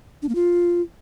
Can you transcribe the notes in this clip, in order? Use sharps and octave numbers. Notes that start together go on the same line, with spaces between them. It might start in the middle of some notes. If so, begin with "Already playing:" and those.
D4
A#3
F4